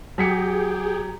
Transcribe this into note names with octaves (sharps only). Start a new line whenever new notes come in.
F#3 G4 G#4 G5 B6 C#7